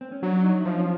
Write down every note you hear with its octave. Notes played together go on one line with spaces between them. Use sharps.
C4
C#4
F#3 D4
D#4
E4
F3 D#4
C#4